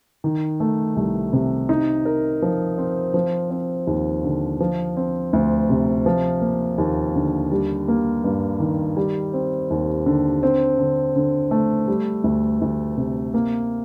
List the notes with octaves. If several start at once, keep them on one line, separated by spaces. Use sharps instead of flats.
D#3
A3
C2
C3
D#4
A#4
F3
C4
F3
C4
D#2
D3
F3
C4
D2
C3
F3
A#3
D#2
D3
G3
A#3
G2
D#3
G3
C4
D#2
D3
C4
D3
D3
A3
G3
D2
D2
C3
A#3